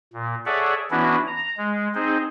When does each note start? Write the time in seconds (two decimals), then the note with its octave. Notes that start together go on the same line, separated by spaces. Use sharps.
0.13 A#2
0.46 G#4 A4 C#5 D5 E5 F#5
0.91 E3 B3 C#4 D4 E4 F#4
1.27 A#5
1.57 G#3
1.95 C4 D#4 G#4 C5